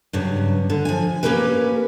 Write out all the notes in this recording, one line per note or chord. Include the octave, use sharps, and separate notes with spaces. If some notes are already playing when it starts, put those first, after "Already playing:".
G2 C#3 F#3
D3
F3 G#5
A#3 C#4 G4 A#4 B4